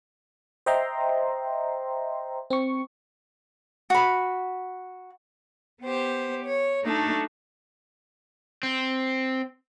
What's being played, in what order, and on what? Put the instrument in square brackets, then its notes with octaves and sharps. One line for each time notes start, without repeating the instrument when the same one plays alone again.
[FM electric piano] C5 D#5 E5 G5 A#5 C6
C4 C#6
[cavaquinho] F#4 B5
[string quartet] B3 G4 C5
C#5
A3 D4 D#4 F#4 A4
[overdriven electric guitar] C4